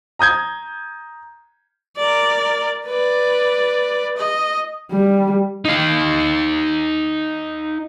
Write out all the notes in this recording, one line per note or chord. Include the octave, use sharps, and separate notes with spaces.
A#5 D#6 G6 G#6
A#4 D5
B4 D5
D#5
G3
D#4 F5